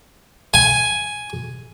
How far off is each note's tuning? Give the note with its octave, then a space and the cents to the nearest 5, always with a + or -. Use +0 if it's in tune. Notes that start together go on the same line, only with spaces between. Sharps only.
G#5 +5